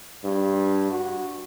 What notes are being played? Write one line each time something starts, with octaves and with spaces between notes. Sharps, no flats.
G2
F#4